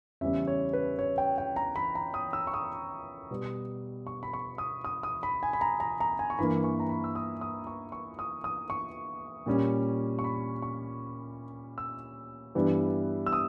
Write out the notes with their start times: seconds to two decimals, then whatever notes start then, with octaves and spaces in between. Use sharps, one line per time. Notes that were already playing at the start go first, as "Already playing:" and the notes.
0.21 E2 C#3 G3 C#4 E5
0.47 C#5
0.73 B4
0.99 C#5
1.18 G5
1.38 G5
1.56 A#5
1.76 B5
1.95 A#5
2.14 D#6
2.33 E6
2.47 C#6
2.54 D#6
3.31 B2 G3 B3
4.07 C#6
4.23 B5
4.33 C#6
4.58 D#6
4.84 D#6
5.03 D#6
5.23 B5
5.43 G#5
5.53 B5
5.61 A#5
5.80 A#5
6.00 A#5
6.19 G#5
6.30 C#6
6.38 G2 E3 A#3 B5
6.64 C#6
6.80 A#5
6.89 B5
7.04 E6
7.15 D#6
7.41 D#6
7.67 C#6
7.92 C#6
8.19 D#6
8.44 D#6
8.70 C#6
9.46 A#2 G3 C#4
10.19 C#6
10.24 B5
10.62 C#6
11.78 E6
12.55 G2 E3 G3 B3
13.26 E6
13.33 D#6